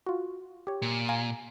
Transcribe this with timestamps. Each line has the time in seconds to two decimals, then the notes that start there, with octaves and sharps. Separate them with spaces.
0.06 F4 F#4
0.67 G4 C#5
0.82 A#2
1.09 F5 G#5 A#5